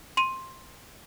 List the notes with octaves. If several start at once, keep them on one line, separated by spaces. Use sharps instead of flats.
C6 D#7